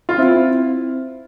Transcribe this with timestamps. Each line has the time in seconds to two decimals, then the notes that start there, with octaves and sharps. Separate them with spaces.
0.09 F4
0.18 C4 E4